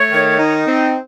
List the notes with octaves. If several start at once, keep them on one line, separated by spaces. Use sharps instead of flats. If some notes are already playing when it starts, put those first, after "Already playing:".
Already playing: A3 C#5
D#3
D#4
C4